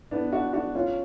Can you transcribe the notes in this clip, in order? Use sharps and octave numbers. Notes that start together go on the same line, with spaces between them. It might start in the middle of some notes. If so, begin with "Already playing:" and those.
B3 D4
D4 F#4
D4 F#4
C#4 F4